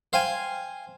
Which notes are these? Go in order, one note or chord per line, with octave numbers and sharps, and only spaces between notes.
C5 F5 G5 G#5